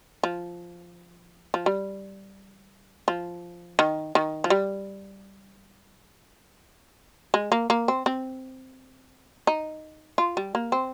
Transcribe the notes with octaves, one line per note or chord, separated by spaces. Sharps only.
F3
F3
G3
F3
D#3
D#3
F3
G3
G#3
A#3
A#3
C4
C4
D#4
F4
G3
A#3
C4